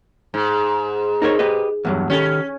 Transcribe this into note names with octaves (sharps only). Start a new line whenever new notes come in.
G#2
D#4 A#4 C#5
G4 B4 D#5
E2 G2 F#3
D#3 C#4 G4 A4